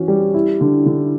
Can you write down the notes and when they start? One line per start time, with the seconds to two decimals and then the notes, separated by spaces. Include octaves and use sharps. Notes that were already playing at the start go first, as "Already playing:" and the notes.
Already playing: E3 C#4 F#4
0.08 G3
0.34 E4
0.61 D3
0.86 D3